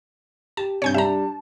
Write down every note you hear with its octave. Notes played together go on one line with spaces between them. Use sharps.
G4 A5
G2 C3 C#5 G#5 G6
G3 D4 E5 A5 A#5